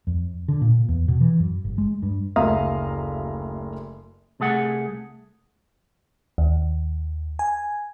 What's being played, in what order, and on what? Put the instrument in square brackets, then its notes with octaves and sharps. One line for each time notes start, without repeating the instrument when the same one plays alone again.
[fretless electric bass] F2
D3
A#2
E2
B2
E3
F#2
G1
G#3
G2
[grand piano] F#1 D2 E5 F5 A#5 D#6
[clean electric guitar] C2 A3 G#4 F#5
[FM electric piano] D#2
G#5